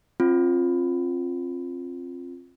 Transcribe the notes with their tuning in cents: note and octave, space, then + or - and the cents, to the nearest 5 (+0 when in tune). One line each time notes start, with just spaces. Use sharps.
C4 +30 F4 +0